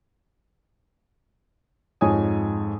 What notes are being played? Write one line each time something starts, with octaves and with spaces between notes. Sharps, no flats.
F2 G#2 D#4 C#5 G#5 D#6